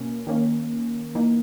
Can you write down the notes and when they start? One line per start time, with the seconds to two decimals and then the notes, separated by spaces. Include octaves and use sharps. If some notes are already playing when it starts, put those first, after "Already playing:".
Already playing: B2 A#3 C#4
0.27 D#3 A#3 C#4
1.15 E3 A#3 D#4